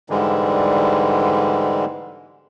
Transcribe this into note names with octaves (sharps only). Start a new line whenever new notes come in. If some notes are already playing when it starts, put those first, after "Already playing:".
G#2 D3 E3 G3 G#3